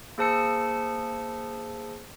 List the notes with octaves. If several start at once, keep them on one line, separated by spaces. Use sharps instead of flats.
A#3 G#4 C5 A5 E6 C#7